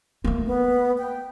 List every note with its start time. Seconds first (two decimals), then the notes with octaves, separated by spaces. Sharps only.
0.24 A3 A#3
0.47 B3
0.98 G5